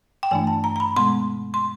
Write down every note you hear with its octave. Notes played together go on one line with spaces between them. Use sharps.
G5
G2 E3 A3 D4 G#5
A5
A#5
A#5
B5
B2 G#3 B3 C6
C6